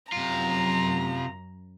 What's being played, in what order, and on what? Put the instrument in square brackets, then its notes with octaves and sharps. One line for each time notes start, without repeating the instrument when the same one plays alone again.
[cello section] F#2 [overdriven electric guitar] C3 F4 [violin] A#5